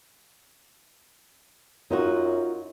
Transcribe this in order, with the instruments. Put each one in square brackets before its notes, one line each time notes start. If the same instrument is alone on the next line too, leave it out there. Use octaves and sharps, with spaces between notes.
[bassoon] F#2 [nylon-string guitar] D#4 F4 F#4